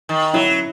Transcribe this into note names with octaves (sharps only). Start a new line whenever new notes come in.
D#3
F#3 E4